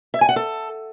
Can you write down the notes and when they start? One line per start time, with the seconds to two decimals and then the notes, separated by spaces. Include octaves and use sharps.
0.14 E5
0.21 G#5
0.29 F#5
0.36 A4